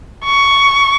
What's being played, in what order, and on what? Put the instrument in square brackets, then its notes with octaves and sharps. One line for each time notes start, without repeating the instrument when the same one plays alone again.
[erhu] C#6